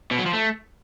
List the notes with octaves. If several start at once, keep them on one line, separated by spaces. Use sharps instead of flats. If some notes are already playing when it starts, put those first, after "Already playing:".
B2
F#3
F3
A3